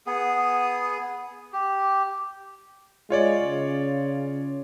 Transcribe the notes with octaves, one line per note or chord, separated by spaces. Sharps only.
B3 G#4
G4
G#3 F4 C#5 D5
C#3